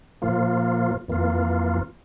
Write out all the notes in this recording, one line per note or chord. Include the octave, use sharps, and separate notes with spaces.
A#2 F3 A#3 F4
F2 E3 A#3 F4